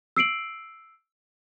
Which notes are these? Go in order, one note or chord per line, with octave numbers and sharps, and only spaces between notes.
E6 C7 D7 F#7